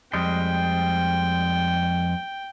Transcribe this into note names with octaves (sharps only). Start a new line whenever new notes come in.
F2 G3 G#3 G5